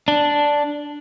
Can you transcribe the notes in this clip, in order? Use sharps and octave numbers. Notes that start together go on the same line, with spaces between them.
D4